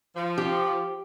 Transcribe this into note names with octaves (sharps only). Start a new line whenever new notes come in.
F3
G4